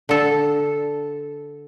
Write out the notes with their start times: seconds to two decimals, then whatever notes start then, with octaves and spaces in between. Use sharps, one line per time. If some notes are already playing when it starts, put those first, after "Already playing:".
0.09 D3 A4